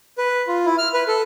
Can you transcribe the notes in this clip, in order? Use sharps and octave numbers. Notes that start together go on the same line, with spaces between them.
B4
F4
E4
F6
B4
A4